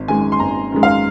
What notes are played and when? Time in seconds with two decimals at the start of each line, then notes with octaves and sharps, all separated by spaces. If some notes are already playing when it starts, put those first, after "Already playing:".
Already playing: G#1
0.08 F#2 D#3 G#3 G#5
0.32 C6
0.40 G#1 A#5
0.72 F#2 D#3 G#3
0.83 F5